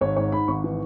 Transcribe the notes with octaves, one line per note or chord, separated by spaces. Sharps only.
G#1 C#5
G#2 C#5
G#2 B5
G#1 C#6
E3